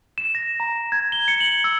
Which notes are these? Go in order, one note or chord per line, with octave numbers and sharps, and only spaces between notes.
E7
A#6
A#5
G#6
G7
C#7
F#7
E6